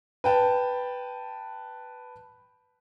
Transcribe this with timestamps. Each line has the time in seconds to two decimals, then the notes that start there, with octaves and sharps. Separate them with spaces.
0.24 B4 G5 A5